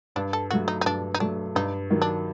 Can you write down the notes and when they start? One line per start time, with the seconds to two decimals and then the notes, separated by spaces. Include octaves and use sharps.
0.16 G2 D4
0.33 A4
0.51 F#3 A3 F#4
0.68 D#4
0.81 D#4
0.85 G2 D4
1.14 D#4
1.20 F#3 A3 D4
1.55 G2 D#4
1.90 D#3 F#3
2.02 D4